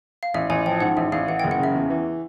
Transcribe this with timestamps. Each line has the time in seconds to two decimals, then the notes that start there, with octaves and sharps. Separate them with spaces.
0.23 F5
0.34 A1 E5
0.50 A1 G#5
0.65 F3 G5
0.80 G#2 F#5
0.97 A1 E5
1.12 A1 F5
1.28 E3 F#5
1.39 F#1 G5
1.51 F#5
1.59 C#3 E5
1.74 E2
1.90 E3